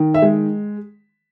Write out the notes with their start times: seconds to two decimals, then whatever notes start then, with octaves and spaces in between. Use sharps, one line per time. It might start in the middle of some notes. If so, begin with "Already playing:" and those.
Already playing: D#3
0.14 E5
0.22 G#3